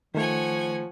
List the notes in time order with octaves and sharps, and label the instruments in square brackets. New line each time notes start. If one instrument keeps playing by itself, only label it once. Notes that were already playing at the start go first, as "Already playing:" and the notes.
[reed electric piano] D#3 A3 [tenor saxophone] F3 [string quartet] C#5 F#5 G#5